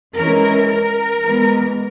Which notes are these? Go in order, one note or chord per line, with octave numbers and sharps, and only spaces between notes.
E3 G#3 C#4 E4 A#4
A#4
E3 G#3 B3